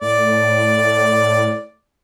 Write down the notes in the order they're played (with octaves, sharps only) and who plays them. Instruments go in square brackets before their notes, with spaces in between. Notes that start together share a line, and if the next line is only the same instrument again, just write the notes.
[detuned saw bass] A2 [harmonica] D5